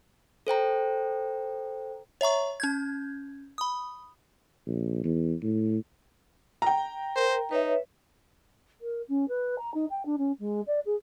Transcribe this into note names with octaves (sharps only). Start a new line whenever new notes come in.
A4 C5 G5 A#5
C#5 E5 A#5 C#6
C#4 G6 G#6
B5 D#6
A#1
E2
A2
G5 A#5
A#4 C5
D#4 B4 C#5 E5
A#4
C#4
B4
A#5
D#4
G5
D4
C#4
G#3
D5
G#4